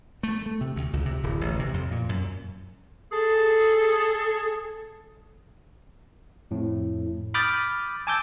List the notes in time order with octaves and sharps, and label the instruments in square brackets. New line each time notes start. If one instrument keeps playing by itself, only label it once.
[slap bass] A3
A3
C3
D2
C#2
C3
D1
A1
C3
F2
A#2
F#2
[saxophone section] G#4 A4
[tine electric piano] F2 A2
B5 D6 D#6 F6 G6 A6
G#5 A5 D6 E6 G6